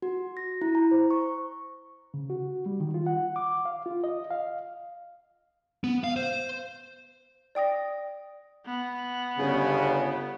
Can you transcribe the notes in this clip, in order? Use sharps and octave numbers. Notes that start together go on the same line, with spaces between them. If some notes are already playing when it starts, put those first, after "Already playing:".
F#4
A#6
E4
A#5
C5
C#6
C#3
F#4
G3
D#3
F4
F#5
D6
F5
F4
D#5
F5
B3
F5
C5
D5 G5 D#6 A#6
B3
G1 C#3